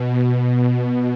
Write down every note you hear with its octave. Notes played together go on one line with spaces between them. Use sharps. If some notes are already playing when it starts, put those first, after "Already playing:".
Already playing: B2
B2